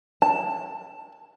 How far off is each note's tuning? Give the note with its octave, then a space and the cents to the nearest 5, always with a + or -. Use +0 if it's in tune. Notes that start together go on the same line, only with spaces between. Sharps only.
A5 +10